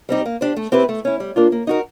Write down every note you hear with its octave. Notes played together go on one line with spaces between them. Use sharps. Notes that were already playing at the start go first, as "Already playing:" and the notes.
G3 C4 D#4 G4
A#3
D4 G4 C5
A3
C4 E4 G4 B4
A3
C#4 E4
G3
A#3 D4 F4
A#3
D#4 F#4 A#4